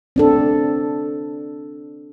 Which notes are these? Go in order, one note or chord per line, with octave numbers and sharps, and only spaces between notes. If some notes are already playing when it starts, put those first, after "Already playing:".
C4 D4 A4